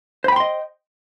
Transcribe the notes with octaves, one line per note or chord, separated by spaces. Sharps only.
C5 D#5 G5 B5 C6